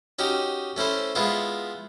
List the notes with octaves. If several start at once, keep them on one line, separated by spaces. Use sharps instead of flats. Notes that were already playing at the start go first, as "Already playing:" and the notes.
C#4 D#4 F#4 G4
A3 C#4 E4 C5
G#3 B3 E4 F4